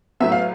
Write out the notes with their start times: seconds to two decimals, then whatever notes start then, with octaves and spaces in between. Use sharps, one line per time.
0.20 A2 F#3 B3 E5
0.32 F5